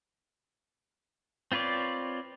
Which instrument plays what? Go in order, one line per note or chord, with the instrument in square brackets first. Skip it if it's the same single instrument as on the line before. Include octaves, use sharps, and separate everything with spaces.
[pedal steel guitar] C4 F4 B4 C#5 D5